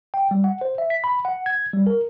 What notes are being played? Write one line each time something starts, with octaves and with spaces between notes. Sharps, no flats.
G5
G3
F#5
C5
E5
B6
B5
F#5
G#6
G3
A#4